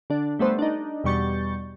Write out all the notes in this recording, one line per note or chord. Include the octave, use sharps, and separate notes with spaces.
D3 D4
G3 A3 B3 C5
D4 D#4
E2 B2 G3 C#6 G6 A6